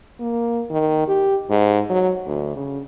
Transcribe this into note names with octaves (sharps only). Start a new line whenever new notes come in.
A#3
D#3
G4
G#2
F#3
D2
C#3